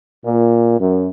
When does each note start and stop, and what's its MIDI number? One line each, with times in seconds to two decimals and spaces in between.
0.25 0.79 46
0.79 1.10 42